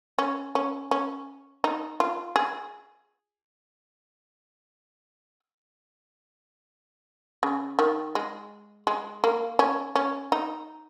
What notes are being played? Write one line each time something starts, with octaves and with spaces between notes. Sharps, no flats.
C#4
C#4
C#4
D#4
F4
G#4
C#3
D#3
G#3
G#3
A#3
C#4
C#4
D#4